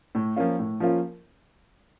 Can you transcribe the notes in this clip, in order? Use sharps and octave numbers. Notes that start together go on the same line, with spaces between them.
A2
F3 A#3 C#4 F4
A2
F3 A#3 C#4 F4